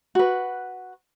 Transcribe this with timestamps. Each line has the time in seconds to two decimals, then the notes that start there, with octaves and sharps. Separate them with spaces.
0.15 F#4 B4